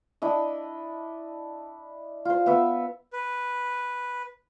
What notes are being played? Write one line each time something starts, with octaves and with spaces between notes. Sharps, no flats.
D4 E4 D#5
F4 C5
B3 E5 E6
B4